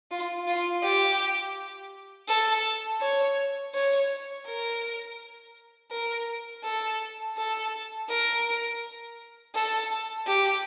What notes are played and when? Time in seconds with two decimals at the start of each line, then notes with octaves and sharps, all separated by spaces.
0.11 F4
0.47 F4
0.83 G4
2.28 A4
3.02 C#5
3.74 C#5
4.46 A#4
5.91 A#4
6.64 A4
7.38 A4
8.09 A#4
9.55 A4
10.27 G4